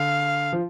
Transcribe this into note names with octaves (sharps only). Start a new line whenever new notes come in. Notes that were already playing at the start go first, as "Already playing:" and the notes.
Already playing: D3 F5
F3